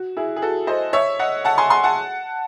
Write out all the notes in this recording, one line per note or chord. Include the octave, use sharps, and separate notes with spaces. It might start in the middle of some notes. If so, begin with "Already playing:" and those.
Already playing: F#4
E4 G#4
G#4
F#4 A4
C5 D#5
C#5 E5
D#5 F#5
F#5 A5
G#5 C6
G#5 C6
F#5 A5